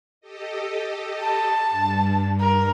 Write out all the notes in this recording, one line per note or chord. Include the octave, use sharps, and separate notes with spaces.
G4 A4 D#5
A5
G2
A#4